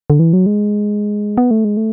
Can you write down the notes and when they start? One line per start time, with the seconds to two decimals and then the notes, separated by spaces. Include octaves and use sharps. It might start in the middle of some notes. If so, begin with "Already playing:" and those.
0.10 D3
0.19 E3
0.33 F#3
0.46 G#3
1.38 B3
1.51 A3
1.65 G#3
1.77 A3